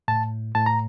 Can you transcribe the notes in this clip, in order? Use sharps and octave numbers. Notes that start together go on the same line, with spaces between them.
A2 A5
A2 A5
A#5